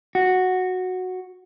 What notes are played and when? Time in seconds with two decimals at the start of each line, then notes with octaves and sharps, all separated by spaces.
0.15 F#4